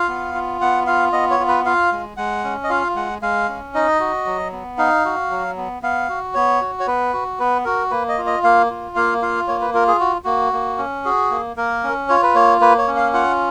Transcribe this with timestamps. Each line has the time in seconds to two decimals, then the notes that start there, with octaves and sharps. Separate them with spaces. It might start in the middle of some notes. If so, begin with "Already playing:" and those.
Already playing: F4 F5
0.08 B3
0.34 F4
0.61 B3 F#5
0.87 F4 F5
1.13 B3 D#5
1.31 C#5
1.40 F4
1.48 B4
1.66 F4 F5
1.92 G#3
2.17 G#3 F#5
2.44 C#4
2.64 D#5
2.69 F4 F5
2.96 G#3 F#5
3.22 G#3 F5
3.49 C#4
3.74 D#4 D#5
4.00 F#4
4.26 F#3
4.52 B3
4.78 D#4 F5
5.05 F#4
5.30 F#3
5.57 B3
5.83 B3 F5
6.09 F#4
6.35 B3 C#5
6.61 F#4
6.80 C#5
6.87 B3 B4
7.13 F#4
7.39 B3 B4
7.65 F#4 A#4
7.91 A#3 B4
8.09 D#5
8.18 F4
8.26 D#5
8.44 A#3 F5
8.70 F4
8.96 A#3 F5
9.22 F4 F5
9.48 A#3 C#5
9.61 B4
9.74 F4 A#4
9.88 G#4
10.00 F#4
10.24 A#3 F#4
10.53 A#3
10.78 C#4
11.05 F#4 G#4
11.31 A#3
11.56 A#3 A#4
11.84 C#4
12.09 F4 C#5
12.23 B4
12.35 A#3 C#5
12.61 A#3 B4
12.78 C#5
12.88 C#4
12.96 F5
13.13 F4 F#5